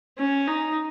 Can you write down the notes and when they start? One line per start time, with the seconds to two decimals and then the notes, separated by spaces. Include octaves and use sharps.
0.18 C#4
0.47 D#4